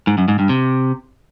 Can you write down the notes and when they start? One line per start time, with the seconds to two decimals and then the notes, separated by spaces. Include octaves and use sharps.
0.07 G#2
0.18 F#2
0.28 G#2
0.39 G2
0.49 C3